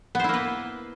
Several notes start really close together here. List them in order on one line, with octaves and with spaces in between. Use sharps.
B3 C5 E4 A#3 B4